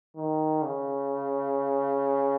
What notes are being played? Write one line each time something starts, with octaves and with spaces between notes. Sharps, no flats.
D#3
C#3